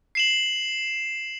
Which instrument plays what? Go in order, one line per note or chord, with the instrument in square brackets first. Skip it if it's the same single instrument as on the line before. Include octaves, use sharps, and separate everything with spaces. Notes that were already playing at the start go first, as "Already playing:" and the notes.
[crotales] C7 E7 F#7